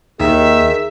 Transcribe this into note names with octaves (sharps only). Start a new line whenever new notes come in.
D#2 D#3 G#4 E5